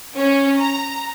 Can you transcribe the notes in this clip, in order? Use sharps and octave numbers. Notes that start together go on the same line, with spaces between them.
C#4
A#5